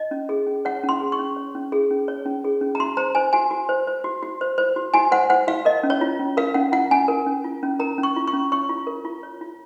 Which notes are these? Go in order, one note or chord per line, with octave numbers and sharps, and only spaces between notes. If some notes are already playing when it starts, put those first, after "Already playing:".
Already playing: D#5
C#4
G#4
C#4
C#5 F#5
C#4
C6
G#4
C#6
C#4
C#5
C#4
G#4
C#4
C#5
C#4
G#4
C#4
A#5
F#4 C6
C5 A#5
C5 G#5
F#4 G#5
F#4
C5
C5
F#4
F#4
C5
C5
F#4
F#4 G#5
C5 F#5
C5 F#5
F#4 F5
A#4 D#5
C#4
C#5
F4
C#4
A#4 F5
C#4 F#5
F4 F#5
C#4 G#5
A#4
C#4
F4
C#4
A#4 A#5
C#4
C#6
F4
C#6
C#4
C#5 C#6
F4
A#4
F4
C#5
F4